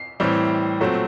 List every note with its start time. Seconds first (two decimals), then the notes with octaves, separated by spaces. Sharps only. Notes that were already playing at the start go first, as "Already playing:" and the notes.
Already playing: C7
0.20 A2 E3 G3 C4
0.80 A#2 F#3 A3 C4